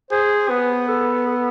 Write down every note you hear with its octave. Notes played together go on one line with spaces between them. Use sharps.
G#4 C5
B3 B4
A4
A4